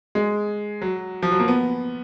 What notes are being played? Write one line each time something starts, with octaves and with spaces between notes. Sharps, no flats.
G#3
F#3
F3
F#3
A#3
B3